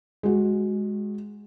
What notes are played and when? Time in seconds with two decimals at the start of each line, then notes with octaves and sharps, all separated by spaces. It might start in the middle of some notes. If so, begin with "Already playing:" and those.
0.23 G#3 F#4